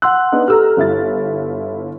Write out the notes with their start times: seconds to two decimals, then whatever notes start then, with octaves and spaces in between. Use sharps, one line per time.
0.02 F#5 C6 E6 F#6
0.32 B3 D4 D#4
0.48 G4 A4 A#5 E6 F6
0.77 G1 E4 A6